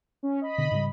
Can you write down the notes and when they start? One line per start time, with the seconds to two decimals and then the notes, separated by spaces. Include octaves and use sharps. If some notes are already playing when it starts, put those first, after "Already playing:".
0.23 C#4
0.41 D#5 B5
0.58 B2 D3
0.71 G#2 C#3 G3